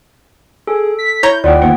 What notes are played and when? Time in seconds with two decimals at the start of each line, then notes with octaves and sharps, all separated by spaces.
0.67 G#4 A4
0.99 B6
1.23 E4 C#5 A#5 G6
1.44 D#2 F4 D5 F#5 G5
1.62 G1 D#3 A#3 C5 F#5